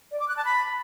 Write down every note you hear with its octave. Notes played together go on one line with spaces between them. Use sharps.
D5
D6
F#6
A5
B5